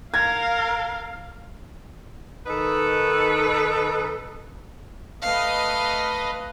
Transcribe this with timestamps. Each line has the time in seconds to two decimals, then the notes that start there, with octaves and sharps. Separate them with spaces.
0.14 A#4 F5 G#6
2.46 D#3 D#4 A4 B4
5.22 A3 B4 D#5 F5